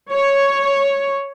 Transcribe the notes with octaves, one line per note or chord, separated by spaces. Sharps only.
C#5